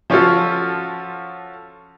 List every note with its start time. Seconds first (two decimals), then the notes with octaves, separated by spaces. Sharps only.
0.10 F3 C#4 F4 F#4 A4